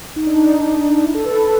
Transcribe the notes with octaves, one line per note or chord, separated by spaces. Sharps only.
D#4
D4
D#4
D#4
E4
A4
B4
B4